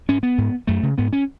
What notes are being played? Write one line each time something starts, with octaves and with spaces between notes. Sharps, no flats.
G#2 C#4
B3
G#2
F#2 A3
C#3
G#2 B3
C#4